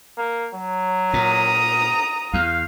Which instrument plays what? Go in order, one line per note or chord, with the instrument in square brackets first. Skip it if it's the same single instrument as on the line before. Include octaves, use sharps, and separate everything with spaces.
[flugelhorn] A#3
F#3
[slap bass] A#2 [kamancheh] A#5 D#6
[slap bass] E2 [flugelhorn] F5